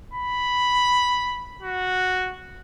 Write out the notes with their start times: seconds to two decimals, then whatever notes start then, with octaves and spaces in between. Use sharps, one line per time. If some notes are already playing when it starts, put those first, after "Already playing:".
0.14 B5
1.62 F#4